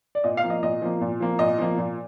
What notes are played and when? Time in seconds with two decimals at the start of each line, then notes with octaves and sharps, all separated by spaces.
0.15 D5
0.24 A#2 D#5
0.37 F5
0.43 F3 A#3
0.50 D#5
0.63 A#2 D#5
0.82 F3 A#3
1.01 A#2
1.20 F3 A#3
1.39 A#2 D#5
1.59 F3 A#3
1.78 A#2